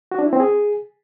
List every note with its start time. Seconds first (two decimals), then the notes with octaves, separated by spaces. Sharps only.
0.12 F#4
0.19 D4
0.26 E4
0.33 C4
0.40 G#4